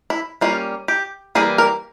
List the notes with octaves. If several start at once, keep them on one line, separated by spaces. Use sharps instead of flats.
E4
G3 A#3 C#4 F4
G4
E3 G3 A#3 G#4
A#4